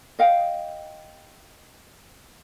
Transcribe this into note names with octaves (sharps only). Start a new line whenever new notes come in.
D#5 F5 G5